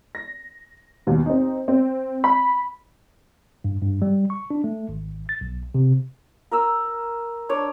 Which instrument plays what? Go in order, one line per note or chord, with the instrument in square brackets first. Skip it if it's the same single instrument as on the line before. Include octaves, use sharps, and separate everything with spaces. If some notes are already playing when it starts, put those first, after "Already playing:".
[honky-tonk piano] A#6
D#2 B2
C4 D#4
C4
B5
[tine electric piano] G2
G2
G3
C#6
D4
A3
G#1
A6
B1
C3
[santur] A#4 A#5 E6
D4 C#5 D5